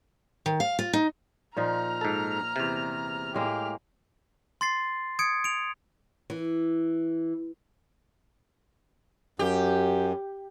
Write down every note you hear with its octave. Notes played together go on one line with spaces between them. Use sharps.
D#3
F5
F4
D#4
A#2 F3 D#4 A#5 F6
G#2 A4
E2 C3
A2 G#3 A#3 G4 F6
C6 A6 C7
D#6 G#6 C#7 D7
D7 F7
E3
F#2 G4